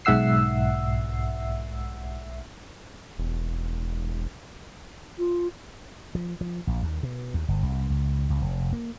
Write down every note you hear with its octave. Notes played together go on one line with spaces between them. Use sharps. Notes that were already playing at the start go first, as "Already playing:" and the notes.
B1 G#2 E5 F#5 E6 C7
E1
F4
F3
F3
A#1
D#2
B2
D#2
G1
C2
C#2
C#2
F1
A#3